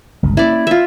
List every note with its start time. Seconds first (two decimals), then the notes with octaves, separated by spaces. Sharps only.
0.23 G1 C#2
0.37 A#3 C#4 E4 D5
0.67 F4 E5